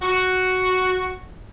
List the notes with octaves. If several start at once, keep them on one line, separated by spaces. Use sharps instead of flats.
F#4